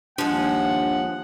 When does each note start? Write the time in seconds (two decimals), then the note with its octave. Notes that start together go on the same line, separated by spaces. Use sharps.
0.18 D#2 F3 G#3 D4 F#5